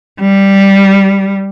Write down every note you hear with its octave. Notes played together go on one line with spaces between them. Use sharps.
G3